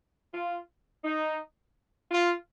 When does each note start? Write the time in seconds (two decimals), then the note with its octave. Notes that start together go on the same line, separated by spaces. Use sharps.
0.34 F4
1.05 D#4
2.11 F4